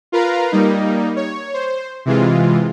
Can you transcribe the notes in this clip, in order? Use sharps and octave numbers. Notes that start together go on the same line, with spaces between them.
F4 A#4 B4 F5 A#5
G3 A#3 D#4
C#5
C5
C3 E3 G#3 F4